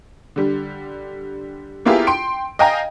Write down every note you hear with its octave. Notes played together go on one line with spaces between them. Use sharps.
D3 G3
A#3 B3 E4 F4 G4 G#4
G5 C6 D7
D#5 F5 G5 G#5 A#5